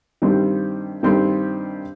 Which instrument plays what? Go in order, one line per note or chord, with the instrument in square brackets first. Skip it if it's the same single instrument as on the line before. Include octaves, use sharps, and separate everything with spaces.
[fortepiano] G2 D#3 G3 C4
G2 D#3 G3 C4